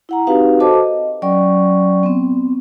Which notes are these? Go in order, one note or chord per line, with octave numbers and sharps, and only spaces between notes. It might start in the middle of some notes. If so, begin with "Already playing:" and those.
E4 F#5 A#5
C4 D#4 F#4 G4 B4 F5
F#4 A4 C5 D#5 A5 D6
D#5
F#3 C#4 D5 G5 C#6
B3 C4